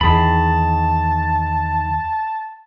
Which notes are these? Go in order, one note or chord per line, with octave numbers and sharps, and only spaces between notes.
E2 D#3 G#4 A5 B5